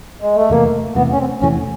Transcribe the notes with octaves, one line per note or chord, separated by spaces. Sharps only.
G#3
A3
E2 C3 E3 A3 A#3
E2 C3 E3 A3 B3
C#4
C4
E2 C3 E3 A3 C#4